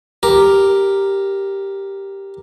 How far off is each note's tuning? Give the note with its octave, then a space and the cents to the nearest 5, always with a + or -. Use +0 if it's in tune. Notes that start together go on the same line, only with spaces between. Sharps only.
G4 +0 A#4 +0